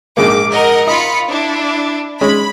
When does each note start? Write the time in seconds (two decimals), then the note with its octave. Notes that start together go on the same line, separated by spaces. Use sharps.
0.17 A#1 G#2 A#3 D6
0.51 A#4 D#5 F#5
0.87 F4 D#5 B5 C#7
1.28 D4 E4
2.21 G#3 C#4 B5